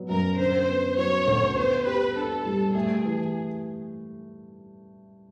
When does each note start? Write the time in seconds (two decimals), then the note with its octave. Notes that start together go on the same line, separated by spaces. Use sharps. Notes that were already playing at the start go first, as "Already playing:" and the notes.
Already playing: F#3 B3
0.09 F#2 A#4
0.38 D3 C5
0.68 B3
0.98 F#3 C#5
1.27 D2
1.57 B3 C5
1.87 G4 B4
2.16 D4 A4
2.46 G3
2.75 A3 G#4
3.04 E3